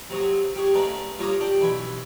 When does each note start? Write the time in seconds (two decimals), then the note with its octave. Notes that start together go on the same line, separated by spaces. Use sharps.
0.10 C3 F#3 C#5 D#6
0.56 G4 G#4 C#5
0.74 C#3 G#3 A3 D4 A#4 B4
1.18 G3 F4 C#5 A#5 D6 D#6
1.40 D4 G4 G5
1.61 B1 E3 G#5 B5